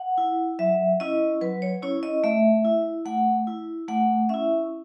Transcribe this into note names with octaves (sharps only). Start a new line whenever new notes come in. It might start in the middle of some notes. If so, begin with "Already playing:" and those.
Already playing: F#5
E4
F#3 E5
C#4 E4 D#5
F#3 B4
C#5
C#4 E4 C#5
D#5
A3 E5
E4
A3 F#5
E4
A3 F#5
C#4 E4 E5